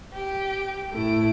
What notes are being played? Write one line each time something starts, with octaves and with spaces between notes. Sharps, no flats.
G4 D7
A2 A3 E4 D7